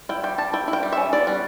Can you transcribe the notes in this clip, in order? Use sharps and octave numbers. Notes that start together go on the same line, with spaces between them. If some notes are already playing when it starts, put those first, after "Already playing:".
E4 G5
G3 G5
G3 A5
E4 G5
E4
G5
G3
C#4 E5
B3 D5
G3